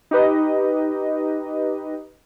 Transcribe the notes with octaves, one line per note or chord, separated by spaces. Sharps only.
D#4 G4 B4 D#5